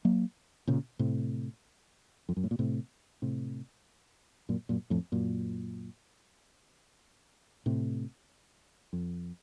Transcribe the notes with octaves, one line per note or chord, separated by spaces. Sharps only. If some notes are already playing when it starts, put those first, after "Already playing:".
F#3 A#3
A#2 C#3
A2 C3
F2
F#2
A2
A#2
A2 C3
A2 C3
F#2 A#2
F#2 A#2
F2 A2
F#2 A#2
A2 C3
F2